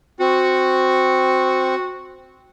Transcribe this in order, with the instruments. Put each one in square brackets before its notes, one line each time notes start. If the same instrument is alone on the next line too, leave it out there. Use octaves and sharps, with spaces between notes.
[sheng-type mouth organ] C4 C#6 [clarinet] F#4